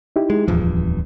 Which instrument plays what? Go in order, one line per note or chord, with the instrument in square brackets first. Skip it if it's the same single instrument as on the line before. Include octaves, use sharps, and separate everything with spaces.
[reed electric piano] D#4 E4 G4
[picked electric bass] G#3
[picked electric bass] D1 E2 G2 [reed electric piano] F3